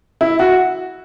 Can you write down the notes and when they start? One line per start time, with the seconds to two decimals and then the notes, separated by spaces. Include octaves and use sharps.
0.21 E4
0.39 F#4